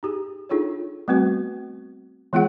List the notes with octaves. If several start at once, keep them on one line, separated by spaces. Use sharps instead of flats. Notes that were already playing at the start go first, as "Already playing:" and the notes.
D#4 G4 G#4
D4 D#4 F4 G#4 A4 C#5
G3 A3 B3 C4 F#4 B4
E3 G#3 B3 F4 G#4 F#5